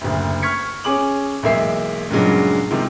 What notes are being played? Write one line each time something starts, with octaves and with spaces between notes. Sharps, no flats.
F#1 D2
C#6 F6 G#6 B6 C#7
C#4 G#4 D6 F#7
B1 E3 G#3 A#3 E5 C7
G2 A#2 C#3 F#3 G#3
G#2 C3 D#3